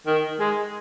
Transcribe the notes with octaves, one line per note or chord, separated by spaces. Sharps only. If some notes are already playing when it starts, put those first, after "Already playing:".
D#3
G#3